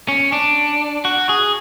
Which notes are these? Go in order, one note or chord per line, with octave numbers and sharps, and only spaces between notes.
C#4
D4
F#4
G#4